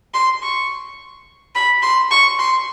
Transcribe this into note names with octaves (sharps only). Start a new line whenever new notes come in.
C6
C#6
B5
C6
C#6
C6